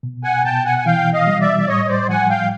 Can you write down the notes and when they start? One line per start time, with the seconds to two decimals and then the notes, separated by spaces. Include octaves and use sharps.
0.03 B2
0.24 F#5 G#5
0.45 B2 G5 A5
0.65 F#5 G#5
0.78 G#5
0.86 E3 F5 G5
1.13 D#5 F5
1.27 G3
1.41 D5 E5
1.60 D5
1.68 A2 C#5 D#5
1.85 C#5
1.89 C5 D5
2.09 F3 F#5 G#5
2.30 F5 G5